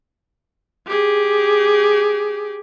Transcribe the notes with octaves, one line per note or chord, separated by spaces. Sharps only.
G4 G#4